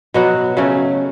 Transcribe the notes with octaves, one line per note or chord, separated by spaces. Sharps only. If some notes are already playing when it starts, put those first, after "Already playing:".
B2 F#3 B3 F#4
C#3 F#3 A3 C#4